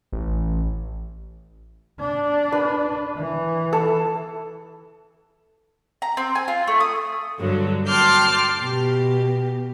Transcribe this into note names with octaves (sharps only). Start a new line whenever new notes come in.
A1
D4
B4
E3
A4
A#5
C4
G#5
F4
A3
D#6
G2 D3 F#3
G5 A5 C6 D6 F6 G6
B2 G4